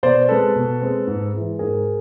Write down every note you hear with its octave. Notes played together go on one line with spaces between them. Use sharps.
B2 C5 D5
G#3 C4 A4 B4
B2
G#3 C4
G#2
E3 G#3
G#2 G#4 A#4